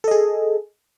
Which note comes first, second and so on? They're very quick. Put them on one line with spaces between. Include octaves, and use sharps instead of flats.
A4 D#5 G#4